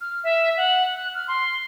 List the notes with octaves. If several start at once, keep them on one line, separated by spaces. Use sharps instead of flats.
F6
E5
F#5
F#6
F6
C6